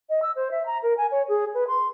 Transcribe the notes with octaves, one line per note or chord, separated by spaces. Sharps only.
D#5
E6
C5
E5
A#5
A#4
G#5
C#5
G#4
B4
C6